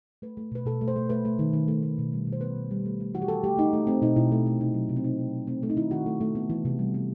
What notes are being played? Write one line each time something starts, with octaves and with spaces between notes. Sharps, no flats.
A3 B4
A3
B2 B4
B2 A4
A3
C5
A3
A3 B4
A3
D#3
D#3
A3
A3
B2
G3
B2
C5
B3 B4
B2
G3
A3
A3
E3 F#4
G4
E3 A4
A3 G4
A3 D#4
A3
A3 C4
B2 D#4
B2 E4
A3
A3
C3 D#4
F#3
C3
C4
B3 D#4
C3
F#3
A3 C4
A3 C4
D#4
D#3 E4
D#3 F#4
A3
A3
B3
E3
C3
G3
B3